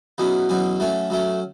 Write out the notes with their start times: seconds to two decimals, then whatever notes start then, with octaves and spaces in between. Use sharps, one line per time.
0.18 E2 B2 F#3 C#4
0.49 E2 B2 F#3 C#4
0.80 F#3 A3 C#4
1.10 F#3 A3 C#4